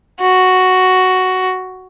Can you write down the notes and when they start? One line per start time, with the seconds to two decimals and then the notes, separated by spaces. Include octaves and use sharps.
0.20 F#4